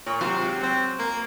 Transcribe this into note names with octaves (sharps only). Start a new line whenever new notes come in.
A#2 C#5
C3 F#3 C4 F4
F#3 G#3
C4
A#3